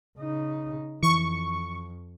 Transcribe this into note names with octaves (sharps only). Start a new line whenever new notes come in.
C#3 D#4
F2 E3 C#6